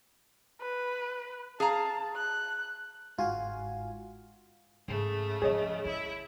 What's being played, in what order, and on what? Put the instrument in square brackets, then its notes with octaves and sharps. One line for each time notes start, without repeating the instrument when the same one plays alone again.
[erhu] B4
[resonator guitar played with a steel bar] G#4 F5 A#5 [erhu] A5
[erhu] F#6
[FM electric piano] G1 G#2 F4 F#4 F5 G#5
[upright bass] G#2 [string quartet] C#3 A3
[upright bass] G#2 F3 [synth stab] G#4 C#5 D#5
[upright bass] D#3 [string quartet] E4 E5